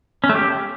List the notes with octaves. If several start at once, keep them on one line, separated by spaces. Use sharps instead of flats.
C#4
A3
G4